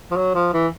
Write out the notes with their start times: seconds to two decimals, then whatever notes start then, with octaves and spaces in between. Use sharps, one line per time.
0.11 F3
0.17 F#3
0.35 F3
0.53 E3